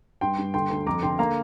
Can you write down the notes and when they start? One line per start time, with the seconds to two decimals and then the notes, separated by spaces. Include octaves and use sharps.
0.21 G2 G5 C6
0.38 G2
0.54 D3 G5 C6
0.70 D2
0.87 F2 A#5 D6
1.03 D3 G5 C6
1.19 A#3 F5 A#5